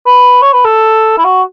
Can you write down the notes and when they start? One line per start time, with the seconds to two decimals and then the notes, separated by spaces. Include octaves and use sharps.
0.06 B4
0.42 C#5
0.53 B4
0.64 A4
1.18 E4
1.24 F#4